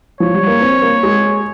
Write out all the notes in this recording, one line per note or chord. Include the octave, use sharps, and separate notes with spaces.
F3 C#5
G3
A#3
C4
A#3
G#3